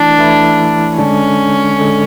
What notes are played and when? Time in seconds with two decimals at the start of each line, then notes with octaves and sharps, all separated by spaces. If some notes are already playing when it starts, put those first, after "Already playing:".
Already playing: E3 A3 D4 E4
0.18 E3 A3 E4
0.98 D3 G#3 C#4 D4 A4
1.79 D3 G#3 D4 A4